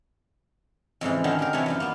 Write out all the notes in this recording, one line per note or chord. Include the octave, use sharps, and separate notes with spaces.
F2 G#2 C#3 E3
D3 D#3 F#3 C4 C#4
F#3 G4 A#4
C3 E3 D4 C#5 B5
F#2 D#3 F4
A#3 B3